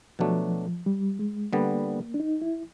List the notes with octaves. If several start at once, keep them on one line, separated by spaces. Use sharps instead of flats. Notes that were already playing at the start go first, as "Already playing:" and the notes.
B2 F3 F#3 A3 D4
G3
G#3
D3 G3 A#3 B3
D4
D#4
E4